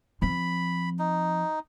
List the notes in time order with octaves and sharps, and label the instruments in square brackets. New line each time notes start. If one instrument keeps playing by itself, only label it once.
[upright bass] F3 C4 [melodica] B5
[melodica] D#4